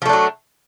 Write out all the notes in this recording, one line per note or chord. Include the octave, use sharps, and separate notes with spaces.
F3 F#3 A3 D4